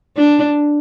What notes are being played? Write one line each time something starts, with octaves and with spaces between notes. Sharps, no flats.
D4